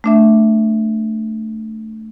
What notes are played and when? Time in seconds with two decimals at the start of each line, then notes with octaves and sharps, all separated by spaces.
0.04 A3 D4 E5